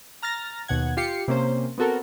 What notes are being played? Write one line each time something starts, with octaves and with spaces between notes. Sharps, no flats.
A#5 F6 A6 A#6
D#2 B2 F#5 G#6
F4 G4 C7 C#7
C3 A#3 C#4 C5
B3 C4 F#4 A4 A#4